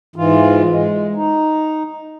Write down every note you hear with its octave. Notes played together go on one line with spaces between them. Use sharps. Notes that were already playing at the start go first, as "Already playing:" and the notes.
G#2 E3 F4
G#3
D#4